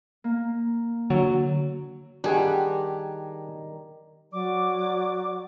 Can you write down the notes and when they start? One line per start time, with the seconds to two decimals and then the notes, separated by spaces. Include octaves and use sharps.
0.24 A#3
1.10 D3 F#3
2.24 D#3 G3 D4 G#4 F#5
4.33 F#3 D5 D6